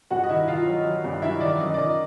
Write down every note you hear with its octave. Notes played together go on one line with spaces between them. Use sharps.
G2 F#4 F#5
D#5
D#3 E4 E5
D#3 F4 F5
F#3
F#3
G2
F#3 E4 E5
D#3 D5
F#2 D#5
D5
D#3 D#5